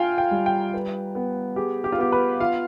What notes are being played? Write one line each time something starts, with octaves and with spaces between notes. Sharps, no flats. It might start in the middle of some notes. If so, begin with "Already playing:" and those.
Already playing: F4 F5 G5 G#5
G5
G3
G5
B4
B3
G4 G#4
G4
F4
B3 G4
B4
F4 F5